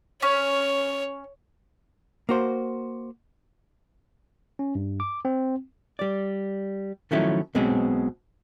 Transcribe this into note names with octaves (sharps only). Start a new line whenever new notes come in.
C#4 C#5
A#3 F#4 C5
C#4
G2
D6
C4
G3 D5
D#3 F3 F#3 A3 C#4 E4
B1 B2 G#3 C4 C#4